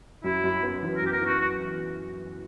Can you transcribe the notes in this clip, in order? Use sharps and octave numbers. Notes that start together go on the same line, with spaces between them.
F#2 E4
F#2
B3
E3
A#4
F#2 G4
A#4
B3 F#4
F#4